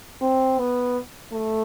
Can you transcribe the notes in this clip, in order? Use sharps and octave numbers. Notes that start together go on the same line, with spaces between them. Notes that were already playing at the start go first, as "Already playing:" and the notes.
C4
B3
A3